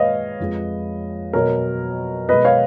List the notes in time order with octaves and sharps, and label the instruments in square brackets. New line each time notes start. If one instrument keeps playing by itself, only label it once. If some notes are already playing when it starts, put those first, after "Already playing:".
Already playing: [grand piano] A#2 G#3 B4 C#5 D#5 F5
F2 F3 G#3
B2 F#3 A#4 C#5
B2 G#3 B4 D#5
C#5 F5